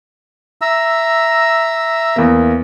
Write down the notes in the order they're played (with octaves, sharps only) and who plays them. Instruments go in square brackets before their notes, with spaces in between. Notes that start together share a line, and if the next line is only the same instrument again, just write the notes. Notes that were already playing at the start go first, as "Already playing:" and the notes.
[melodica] E5 A#5 E6
[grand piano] E2 A#3